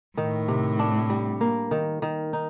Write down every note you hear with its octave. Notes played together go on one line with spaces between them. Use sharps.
A2 D#3
C3
D4
G3
A#3
D#3
D#3
D#4